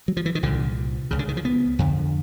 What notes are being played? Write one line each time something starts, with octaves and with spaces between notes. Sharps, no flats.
F#3
F3
E3
D#3
C2 A#2 D3
C#2 C#3
D3
D#3
F3
B3
F2 D3